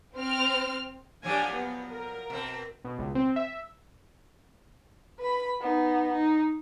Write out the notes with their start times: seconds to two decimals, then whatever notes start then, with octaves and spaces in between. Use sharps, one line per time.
0.16 C4 F6
1.23 A#2 F3 F#3 D4 G4 G#5
1.54 B3
1.89 A#4
2.30 B2 C4
2.85 B2
2.99 C#2
3.15 C4
3.36 E5
5.19 B4 B5
5.61 B3 D#4
6.12 D#4